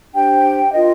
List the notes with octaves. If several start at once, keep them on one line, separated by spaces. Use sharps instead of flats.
D4 G4 C5 G5
F4 A#4 D#5